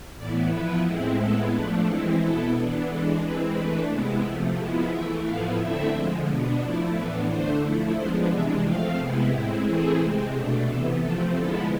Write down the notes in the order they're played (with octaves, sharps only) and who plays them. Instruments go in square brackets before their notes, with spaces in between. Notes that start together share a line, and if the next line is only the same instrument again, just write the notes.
[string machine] A2 E3 B3 E4 D5
F3 B3 E4 B4
A2 G#3 C4 E4
A2 G#3 B3 E4 A4
F3 A3 D4 B4
E3 G#3 C4 E4 A4
B2 B3 E4 A4
E3 B3 D4
E3 G#3 D4 A4
E3 G#3 C4 E4 B4
E3 A3 D4 B4
C3 G#3 B3 E4
C3 F3 A3
F3 G#3 B3 E4
E3 A3 E4 E5
A2 F3 B3 E4 F5
D3 A3 C4 E4 E5
D3 F3 G#3
B2 B3 D4
F3 A3 E4 D5
A2 E3 B3 D4 B4
D3 A3 D4 C5
F3 A3 E4
F3 G#3 B3 D4 C5
C3 E3 G#3 D4 E5
F3 A3 C4 F5
C3 G#3 B3 E4
A2 G#3 C4 E4
E3 A3 C4 E4 G#4
C3 G#3 C4
B2 A3 D4
C3 E3 B3 A4
C3 F3 A3 C4 A4
D3 F3 G#3 B3 E4 A4